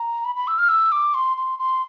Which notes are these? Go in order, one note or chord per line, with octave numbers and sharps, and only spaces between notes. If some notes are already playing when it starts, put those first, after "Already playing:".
Already playing: A#5
B5
B5
E6
F6
E6
D6
C6
C6
C6